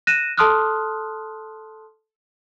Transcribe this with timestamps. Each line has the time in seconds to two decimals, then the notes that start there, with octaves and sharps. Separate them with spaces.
0.07 F#6 A#6 D#7 E7
0.37 A4 A5 C6 D#6 F6 F#6